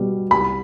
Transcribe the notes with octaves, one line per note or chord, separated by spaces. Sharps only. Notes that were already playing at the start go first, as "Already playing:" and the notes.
Already playing: B2 G3
C2 B5